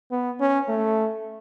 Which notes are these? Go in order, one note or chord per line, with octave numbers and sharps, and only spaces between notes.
B3
C#4
A3